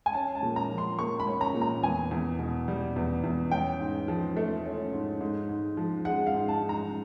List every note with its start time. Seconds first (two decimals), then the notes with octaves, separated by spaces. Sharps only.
0.06 G#5
0.13 C#4 A5
0.35 A5
0.43 A#2
0.56 A#5
0.70 F3
0.78 C6
0.99 A#3 C#6
1.20 B5
1.27 C#4
1.41 A#5
1.54 A#2
1.62 A#5
1.83 E2 G#5
2.11 E2
2.39 B2
2.68 G3
2.96 E2
3.24 E2
3.51 C#4 G5
3.80 G#2
4.08 F3
4.37 A3
4.65 C#4
4.93 G#2
5.20 G#2
5.49 G#2
5.77 F3
6.05 G#3 F#5
6.27 F5
6.34 G#2
6.48 A5
6.62 G#2
6.69 A#5